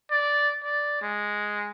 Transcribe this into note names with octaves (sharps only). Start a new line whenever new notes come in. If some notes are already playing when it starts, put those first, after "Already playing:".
D5
D5
G#3